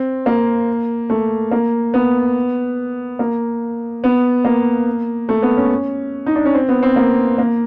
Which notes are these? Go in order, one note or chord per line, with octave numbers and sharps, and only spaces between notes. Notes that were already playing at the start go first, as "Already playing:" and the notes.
Already playing: C4
A#3
A3
A#3
B3
A#3
B3
A#3
A3
B3
C#4
D#4
D4
C#4
C4
B3
C4
A#3
A#3